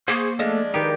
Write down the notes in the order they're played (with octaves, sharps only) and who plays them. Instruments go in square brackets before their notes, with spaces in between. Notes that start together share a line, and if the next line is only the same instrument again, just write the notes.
[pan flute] A#3 [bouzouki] G#4 [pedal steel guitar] C5 C#6
[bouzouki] F3 G#3 D4 [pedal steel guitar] A3 A4
[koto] D#3 G4 [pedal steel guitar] D#4 B4